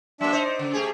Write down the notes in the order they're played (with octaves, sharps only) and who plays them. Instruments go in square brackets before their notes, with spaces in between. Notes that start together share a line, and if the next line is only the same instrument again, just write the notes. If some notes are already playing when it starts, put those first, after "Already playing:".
[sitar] F#3 A#3 [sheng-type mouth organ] D4 E5
[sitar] D#4 C5
[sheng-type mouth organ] D5
[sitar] C#3
A3 G4 G#4